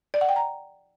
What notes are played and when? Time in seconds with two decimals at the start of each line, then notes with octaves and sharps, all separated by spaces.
0.14 D5
0.21 F#5
0.29 G5
0.36 A#5